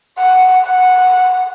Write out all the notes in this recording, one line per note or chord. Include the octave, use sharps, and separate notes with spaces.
F#5
F#5